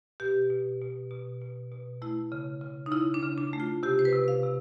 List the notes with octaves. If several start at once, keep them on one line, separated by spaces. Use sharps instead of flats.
B2 G4
B2
B2
B2
B2
B2
A3 E4
C#3
C#3
D#4
C#3 E4
D4
C#3
D4
A3
F4
C3 G4
C5
B4
C3
F5
C3